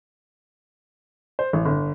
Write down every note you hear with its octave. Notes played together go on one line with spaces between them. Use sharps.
C5
A1
G1